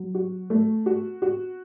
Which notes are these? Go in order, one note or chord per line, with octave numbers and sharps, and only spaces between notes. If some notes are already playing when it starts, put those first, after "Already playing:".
Already playing: F#3
F#4
A3
F#4
F#4